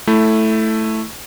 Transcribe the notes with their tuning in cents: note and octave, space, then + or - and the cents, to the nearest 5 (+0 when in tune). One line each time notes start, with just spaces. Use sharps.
A3 +0 E4 +0